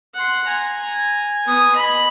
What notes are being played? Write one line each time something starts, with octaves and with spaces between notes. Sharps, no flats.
F#5 C6
G#5 A#5
B3 D#6
D#5 B5